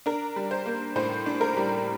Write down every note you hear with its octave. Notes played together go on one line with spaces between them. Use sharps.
D4 A#4
G3
C5
A#3
A2 C5
D4
A#4
G3